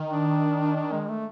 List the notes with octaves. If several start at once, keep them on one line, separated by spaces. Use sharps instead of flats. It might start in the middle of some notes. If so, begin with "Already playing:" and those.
Already playing: D#3
D4
D4
G#3
A3